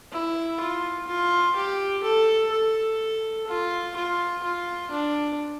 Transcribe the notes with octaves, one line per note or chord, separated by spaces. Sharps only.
E4
F4
F4
G4
A4
A4
F4
F4
F4
D4